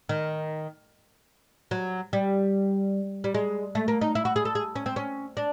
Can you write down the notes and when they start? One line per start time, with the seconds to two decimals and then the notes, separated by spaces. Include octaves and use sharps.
0.09 D#3
1.71 F#3
2.13 G3
3.24 G3
3.34 G#3
3.75 A3
3.88 A#3
4.01 D#4
4.15 E4
4.25 F#4
4.36 G#4
4.45 A4
4.55 G#4
4.76 C#4
4.86 C4
4.96 C#4
5.37 D4